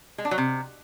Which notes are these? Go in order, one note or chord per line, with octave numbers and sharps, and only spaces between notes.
G#3
D4
F#3
C3